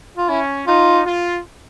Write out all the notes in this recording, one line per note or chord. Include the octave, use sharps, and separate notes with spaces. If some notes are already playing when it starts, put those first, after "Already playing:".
F4
C#4 E4
D#4 F4
F4